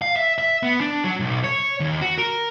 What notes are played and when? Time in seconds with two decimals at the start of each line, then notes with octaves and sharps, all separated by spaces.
0.02 F5
0.16 E5
0.38 E5
0.63 B3
0.81 D4
1.04 F#3
1.20 B1
1.44 C#5
1.80 D#2
2.01 F#4
2.18 A#4